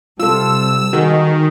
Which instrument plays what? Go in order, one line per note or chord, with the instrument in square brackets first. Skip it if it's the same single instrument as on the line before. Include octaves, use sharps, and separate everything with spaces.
[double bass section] C3 G3 [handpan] F4 A4 [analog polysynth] E6
[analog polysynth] D#3 [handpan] F#4 G#4